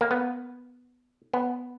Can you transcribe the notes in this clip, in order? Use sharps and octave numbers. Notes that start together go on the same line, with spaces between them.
A#3
B3
B3